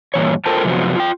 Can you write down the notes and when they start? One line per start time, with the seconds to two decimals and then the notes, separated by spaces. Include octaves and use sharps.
0.14 G2 A#2 E3 C#5
0.46 F4 A4 A#4 C5 G5 A5
0.64 F#2 C3 F3 B3 F#4
0.96 F4 G5